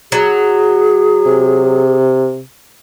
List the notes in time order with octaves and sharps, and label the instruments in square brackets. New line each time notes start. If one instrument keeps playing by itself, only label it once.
[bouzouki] F#3 [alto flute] G#4
[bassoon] C3